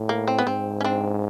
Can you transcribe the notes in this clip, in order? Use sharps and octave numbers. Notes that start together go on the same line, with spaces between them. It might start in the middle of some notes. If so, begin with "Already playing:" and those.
Already playing: A2
A#3
C4
B3
G#2 C4
C#4
C4 D4